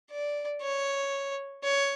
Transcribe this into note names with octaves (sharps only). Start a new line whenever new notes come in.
D5
C#5
C#5